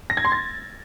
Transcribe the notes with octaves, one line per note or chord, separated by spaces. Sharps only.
A#6
G#6
C6
A6